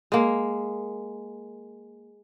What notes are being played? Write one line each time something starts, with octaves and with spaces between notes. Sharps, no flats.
G#3 A#3